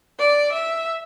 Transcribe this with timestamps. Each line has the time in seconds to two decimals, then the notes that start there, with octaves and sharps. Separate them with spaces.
0.19 D5
0.52 E5